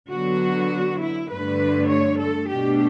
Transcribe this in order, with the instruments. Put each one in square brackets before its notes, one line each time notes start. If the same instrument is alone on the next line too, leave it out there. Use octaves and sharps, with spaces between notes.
[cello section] D3 F#3 B3 F#4
E4
G2 D3 A3 B4
C#5
A4
B2 A3 D4 G4